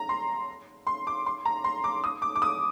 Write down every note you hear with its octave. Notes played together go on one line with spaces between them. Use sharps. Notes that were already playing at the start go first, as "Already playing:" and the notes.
Already playing: A#5
C6
C6
D6
C6
A#5
C6
D6
D#6
D6
D6
D#6